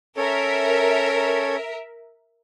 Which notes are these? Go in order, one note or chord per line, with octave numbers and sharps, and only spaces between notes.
C#4 A4 A#4 C#5 E5